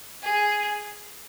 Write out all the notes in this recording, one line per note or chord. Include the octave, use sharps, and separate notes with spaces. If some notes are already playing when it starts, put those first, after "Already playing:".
G#4